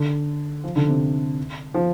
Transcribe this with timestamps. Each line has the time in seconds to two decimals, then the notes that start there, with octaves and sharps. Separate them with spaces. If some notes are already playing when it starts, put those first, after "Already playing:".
Already playing: D3
0.64 F3
0.76 D3
0.89 C3
1.74 F3